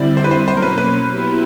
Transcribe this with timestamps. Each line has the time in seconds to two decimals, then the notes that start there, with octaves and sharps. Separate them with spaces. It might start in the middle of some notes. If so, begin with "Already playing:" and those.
Already playing: D3 G3 C4 E4 D5
0.17 C5
0.24 B4
0.31 C5
0.47 B2 F#3 A#3 C#4 C5
0.57 A#4
0.62 B4
0.78 B4
1.08 F#3 B3 E4 G4